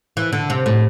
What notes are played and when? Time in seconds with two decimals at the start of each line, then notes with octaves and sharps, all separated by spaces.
0.17 E3
0.33 D3
0.50 C3
0.66 A2